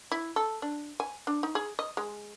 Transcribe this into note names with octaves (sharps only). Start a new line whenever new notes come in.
E4
A4
D4
G#5
D4
D#4
G#4
D#5
G#3